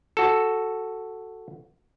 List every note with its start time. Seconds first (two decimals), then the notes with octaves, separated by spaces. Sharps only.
0.17 F#4 A4